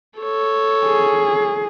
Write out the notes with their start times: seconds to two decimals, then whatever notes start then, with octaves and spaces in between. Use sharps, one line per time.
0.19 A4 C#5
0.86 G#4